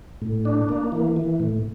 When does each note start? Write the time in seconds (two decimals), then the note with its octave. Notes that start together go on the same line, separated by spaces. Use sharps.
0.22 A2
0.45 D4
0.69 A#3
0.92 E3
1.16 E3
1.40 A2